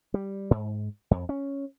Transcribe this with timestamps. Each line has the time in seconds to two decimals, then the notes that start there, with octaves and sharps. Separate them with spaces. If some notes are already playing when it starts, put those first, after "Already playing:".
0.14 G3
0.51 G#2
1.11 F2
1.29 C#4